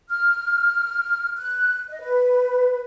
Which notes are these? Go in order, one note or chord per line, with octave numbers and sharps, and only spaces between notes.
F6
F#6
D#5
B4